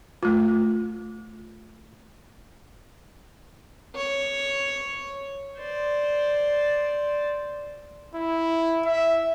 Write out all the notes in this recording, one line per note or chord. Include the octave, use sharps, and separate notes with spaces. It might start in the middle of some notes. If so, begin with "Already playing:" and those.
A3 F4
C#5
C5 D5
E4
E5